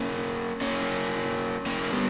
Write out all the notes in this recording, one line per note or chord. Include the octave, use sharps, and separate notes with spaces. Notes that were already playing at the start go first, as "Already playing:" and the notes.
Already playing: A#3 C#4
A#3 C#4
A#3 C#4
G3 B3